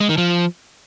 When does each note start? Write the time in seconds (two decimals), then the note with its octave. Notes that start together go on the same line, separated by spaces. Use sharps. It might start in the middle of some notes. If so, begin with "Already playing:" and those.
0.01 G#3
0.09 D#3
0.18 F3